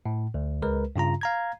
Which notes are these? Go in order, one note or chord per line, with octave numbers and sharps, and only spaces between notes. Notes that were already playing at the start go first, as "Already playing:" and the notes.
A2
D2
C#2 G#3 A#4 B4
G2 C#3 F4 A#5
F5 A#5 G#6